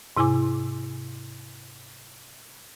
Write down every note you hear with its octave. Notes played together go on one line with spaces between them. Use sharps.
G#2 C3 E4 G#5 D6